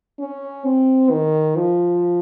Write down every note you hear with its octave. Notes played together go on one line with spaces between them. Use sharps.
C#4
C4
D#3
F3